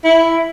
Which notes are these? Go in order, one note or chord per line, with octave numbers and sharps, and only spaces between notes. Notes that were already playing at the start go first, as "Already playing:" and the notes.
E4